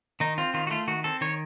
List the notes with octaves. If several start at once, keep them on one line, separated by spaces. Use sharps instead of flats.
D#3 D#4
C4 F4
D#3 F4
F#4
A3 F4
D#3 F#4
C4 A4
D#3 C#5